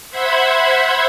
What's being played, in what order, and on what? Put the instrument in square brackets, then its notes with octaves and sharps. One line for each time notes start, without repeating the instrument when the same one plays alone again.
[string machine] C5 E5 F#5 B5 C6 G#6